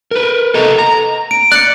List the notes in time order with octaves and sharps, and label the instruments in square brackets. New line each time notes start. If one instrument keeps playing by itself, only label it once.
[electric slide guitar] A#4 B4
A4 D#5 A#5
A#5
[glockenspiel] D7
[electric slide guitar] D5 [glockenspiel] F#6 C#7